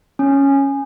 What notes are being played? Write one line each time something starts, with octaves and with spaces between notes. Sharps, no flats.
C#4